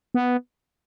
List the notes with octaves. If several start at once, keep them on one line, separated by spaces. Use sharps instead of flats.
B3